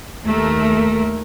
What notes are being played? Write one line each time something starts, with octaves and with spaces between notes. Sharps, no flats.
D#2 A3 A#4